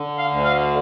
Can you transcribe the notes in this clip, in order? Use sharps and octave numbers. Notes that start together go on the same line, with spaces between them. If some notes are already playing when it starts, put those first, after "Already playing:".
Already playing: D3
F5
D2
F5